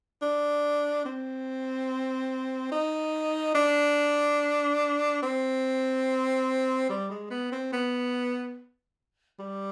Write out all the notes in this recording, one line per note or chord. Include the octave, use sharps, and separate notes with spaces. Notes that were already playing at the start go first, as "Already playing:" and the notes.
D4
C4
D#4
D4
C4
G3
G#3
B3
C4
B3
G3